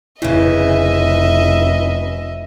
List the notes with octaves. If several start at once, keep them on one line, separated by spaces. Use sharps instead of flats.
F1 C#3 E3 E4 D#5 E5